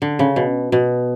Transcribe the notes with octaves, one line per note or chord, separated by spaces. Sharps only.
D3
C#3
B2
B2